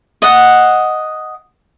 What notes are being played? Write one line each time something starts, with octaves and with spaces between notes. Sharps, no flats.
D#5 F#5